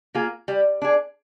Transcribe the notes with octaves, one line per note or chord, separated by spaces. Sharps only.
A#3 F4 G#4
G3
D4 G#4